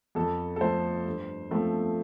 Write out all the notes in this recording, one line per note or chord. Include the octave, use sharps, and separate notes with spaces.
F2 A4
A4
F3 A3 C5
G2
F3 A3 C4